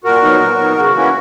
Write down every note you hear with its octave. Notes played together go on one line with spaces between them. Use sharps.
A#2 F#4 A#4
F#3 B3 D#4
A#2
F#3 B3 D#4
C#3 F#4
E3 A#3 C#4 E4